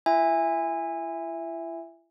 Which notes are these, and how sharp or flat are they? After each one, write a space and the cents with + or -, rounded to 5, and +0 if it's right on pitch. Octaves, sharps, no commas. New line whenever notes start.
E4 +40 E5 +0 G#5 -20